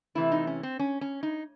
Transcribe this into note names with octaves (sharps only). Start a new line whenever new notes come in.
C3 E3 A3 E4
D#4
C#4
C4
C#4
C#4
D#4